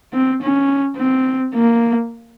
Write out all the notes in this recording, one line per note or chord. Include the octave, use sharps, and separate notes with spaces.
C4
C#4
C4
A#3